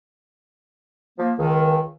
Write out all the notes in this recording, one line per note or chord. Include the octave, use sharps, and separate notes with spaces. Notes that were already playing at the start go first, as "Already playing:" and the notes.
F3 A#3
C#2 D#3